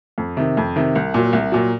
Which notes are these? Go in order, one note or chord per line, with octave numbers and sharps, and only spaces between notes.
F2
C3 D#3
F2
C3 D#3
C2
A#2 F#3
C2
A#2 F#3